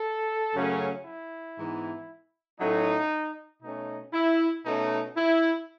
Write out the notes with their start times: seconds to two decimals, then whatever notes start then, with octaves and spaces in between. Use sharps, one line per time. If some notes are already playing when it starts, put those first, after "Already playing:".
Already playing: A4
0.54 F#2 C#3 F#3 A3 C#4
1.05 E4
1.57 G#2 E3 B3
2.59 A2 F#3 A3 C#4 D#4
3.62 B2 A3 C#4 D#4
4.13 E4
4.65 B2 A3 C#4 D#4
5.16 E4